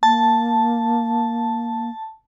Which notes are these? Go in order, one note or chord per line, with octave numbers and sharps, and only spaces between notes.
A#3 A5